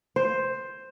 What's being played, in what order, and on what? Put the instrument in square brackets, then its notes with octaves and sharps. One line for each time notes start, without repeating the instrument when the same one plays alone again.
[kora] C5